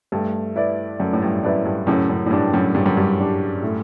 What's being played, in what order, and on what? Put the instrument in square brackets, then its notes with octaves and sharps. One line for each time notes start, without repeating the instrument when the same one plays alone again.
[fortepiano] G2 [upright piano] A3
[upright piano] E4 B4 D5
[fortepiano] F#2 [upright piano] A3
[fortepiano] A2
G2
[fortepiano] F#2 [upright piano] E4 B4 D5
[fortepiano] G2
[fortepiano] F#2 A2 [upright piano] C#3
[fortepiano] F#2
A2
[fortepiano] G2 [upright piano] G3 D4 G4
[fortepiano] F#2 A2
[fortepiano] G2 [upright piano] C#3
[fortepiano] F#2
G2
[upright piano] G3 D4 G4
A2